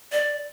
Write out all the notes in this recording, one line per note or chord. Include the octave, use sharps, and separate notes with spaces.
D5